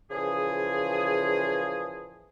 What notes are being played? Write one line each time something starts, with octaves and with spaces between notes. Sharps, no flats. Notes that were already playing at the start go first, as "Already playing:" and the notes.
A#2 C#3 E3 F3 G#4